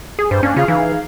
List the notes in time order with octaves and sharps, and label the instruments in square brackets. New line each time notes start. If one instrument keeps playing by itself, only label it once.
[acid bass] G#4
[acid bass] G2 [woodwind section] C5
[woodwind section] A#3 D4 [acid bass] C#4
[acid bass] C#3 [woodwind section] F4 G#4 F5
[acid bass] E3 [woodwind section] D#4 G#4 F5